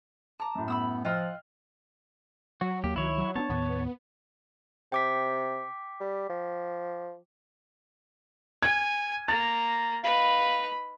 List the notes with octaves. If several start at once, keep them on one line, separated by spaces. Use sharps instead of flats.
A5 A#5 D6
F#2 A2
B3 B5 D#6 E6
F3 F4 D#5 F#5 G5 E6 F6
F#3 F#4
D#2 A#3 G4
C#2 D#3 E4 C#5
F#3
B3 C4 D4 C#5 A5
D#2 A2 D#3 B3
C3 G5 D6 B6
G3
F3
G#5 G#6
A#3 A#5 A6
D#4 B4 F5 B5